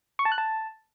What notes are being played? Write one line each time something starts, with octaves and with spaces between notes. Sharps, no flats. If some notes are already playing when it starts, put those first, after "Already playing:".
C#6
A5
F#6
A5